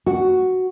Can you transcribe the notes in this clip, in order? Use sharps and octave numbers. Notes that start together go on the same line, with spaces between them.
F#4